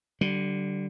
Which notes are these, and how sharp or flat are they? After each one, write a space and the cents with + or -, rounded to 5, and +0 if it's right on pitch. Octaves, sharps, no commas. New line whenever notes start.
D3 +0 G3 -35